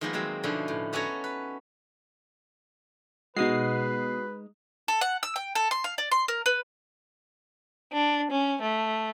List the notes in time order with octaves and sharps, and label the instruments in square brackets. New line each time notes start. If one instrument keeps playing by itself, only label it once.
[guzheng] D#3 F3 G#3 A#3 B3
F#3 G#3 C4
B2 D3 F3 C#4 D#4 E4
A2
B3 C#4 F#4 A4 C#5 A#5
B4
[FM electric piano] B2 D#6 C7 [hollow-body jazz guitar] G#3 D#4 [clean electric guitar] F#4 [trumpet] B4
[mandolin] A4
F#5
E6
G5
A4
C6
F5
D5
C6
A#4
B4
[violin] D4
C#4
A3